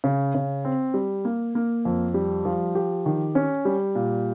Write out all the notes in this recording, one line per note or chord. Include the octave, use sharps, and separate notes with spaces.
C#3
C#3
C4
G3
A#3
A#3
F2
G3
F3
G4
D#3
C#4
G3
A#2